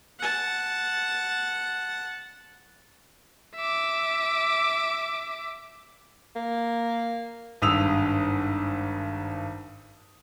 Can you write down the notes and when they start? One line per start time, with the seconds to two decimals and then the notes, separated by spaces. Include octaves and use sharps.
0.19 F#5 A5
3.56 E5 D6
6.36 A#3
7.62 G#1 G2 D#6 E6 F7